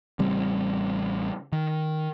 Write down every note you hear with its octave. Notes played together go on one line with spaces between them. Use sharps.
A1 C#3 G3 C4
D#3